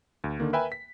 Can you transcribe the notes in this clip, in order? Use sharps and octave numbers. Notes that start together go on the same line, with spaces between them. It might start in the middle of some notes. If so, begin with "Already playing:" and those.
D2
D3 D#3 A#3
A#4 B4 E5 G5 G#5 B5
B6